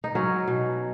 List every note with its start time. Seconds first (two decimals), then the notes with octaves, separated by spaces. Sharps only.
0.04 D#4
0.15 F#3 C#4
0.48 B2